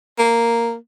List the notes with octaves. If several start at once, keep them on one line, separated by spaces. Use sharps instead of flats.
A#3